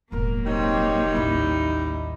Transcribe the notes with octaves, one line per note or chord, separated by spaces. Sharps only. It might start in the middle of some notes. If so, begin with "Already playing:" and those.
E1 A1 F#3 A#3 A#4
G3 C4 D#4 C#5
A1 D#2 E4